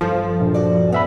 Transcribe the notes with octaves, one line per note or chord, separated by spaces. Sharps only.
E2 G2 F3 A4
A#1
F#4 D5
B3 C#4 E5 B5